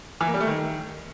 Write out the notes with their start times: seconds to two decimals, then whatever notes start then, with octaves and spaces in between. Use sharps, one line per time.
0.21 E3
0.27 A#3
0.34 G3
0.40 A3
0.47 D#3